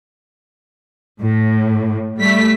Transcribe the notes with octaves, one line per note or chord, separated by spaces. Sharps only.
A2
G3 A3 B6